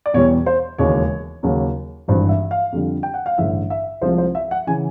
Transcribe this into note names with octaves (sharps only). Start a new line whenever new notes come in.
D5
E2 B2 G3 C#5
C5
E1 D#2 C#3 E3 G#3 C#5
D#2 C#3 F#3
G#1 G2 E3 C5
E5
F5
F2 D3 G3
G5
F#5
F5
A1 G2 D3 E5
E5
C2 C3 F3 G#3 C5
C5
E5
F#5
C#3 E3 G#5